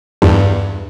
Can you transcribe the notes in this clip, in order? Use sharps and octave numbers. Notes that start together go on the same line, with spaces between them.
E2 G2